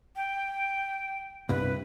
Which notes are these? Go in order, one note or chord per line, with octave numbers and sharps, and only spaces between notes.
G5
C2 G2 B4